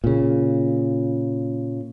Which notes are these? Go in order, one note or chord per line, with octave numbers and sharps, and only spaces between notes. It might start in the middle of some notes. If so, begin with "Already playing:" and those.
A#2 C#3